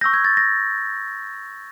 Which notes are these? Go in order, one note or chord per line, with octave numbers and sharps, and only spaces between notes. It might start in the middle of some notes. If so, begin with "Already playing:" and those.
C#6 E6 G6 A#6
G#6
A6
A#6